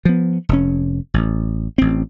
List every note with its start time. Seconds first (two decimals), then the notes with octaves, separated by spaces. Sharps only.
0.05 F3 B3
0.49 F1 B2 C#4
1.14 A1
1.78 A1 C4